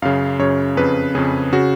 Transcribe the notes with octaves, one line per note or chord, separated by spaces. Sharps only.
F#2 C#3 F5
F#2 C#3 C#5
F2 C#3 B4
F2 C#3 G#4
C#3 F#4